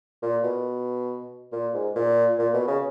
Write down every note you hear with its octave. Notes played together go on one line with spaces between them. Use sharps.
A#2
B2
A#2
G#2
A#2
A#2
B2
C#3